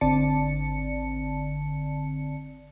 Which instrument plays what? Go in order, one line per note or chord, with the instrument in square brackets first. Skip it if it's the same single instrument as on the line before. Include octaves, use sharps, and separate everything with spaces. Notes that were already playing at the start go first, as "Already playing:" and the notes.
[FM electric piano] G#1 D3 C4 D5 A5 C#7